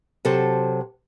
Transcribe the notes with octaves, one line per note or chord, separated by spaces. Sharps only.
C3 F#3 F#4 A4 C5 A5